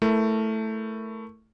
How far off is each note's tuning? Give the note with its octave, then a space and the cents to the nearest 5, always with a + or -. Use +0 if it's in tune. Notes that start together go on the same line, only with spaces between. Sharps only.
A3 +0 E4 +0 A#4 +0